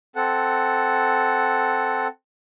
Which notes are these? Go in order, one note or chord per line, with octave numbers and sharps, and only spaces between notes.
C4 A4 F#5